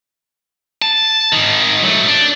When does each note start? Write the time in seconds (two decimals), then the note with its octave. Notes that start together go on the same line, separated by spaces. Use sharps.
0.82 A5
1.33 G#2 D#3
1.83 F#3 A3
2.08 D4